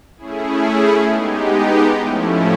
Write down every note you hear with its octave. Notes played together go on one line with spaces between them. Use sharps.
A3 C#4 E4 G#4
G#3 B3 D#4 G4
A2 F3 A3 C#4 E4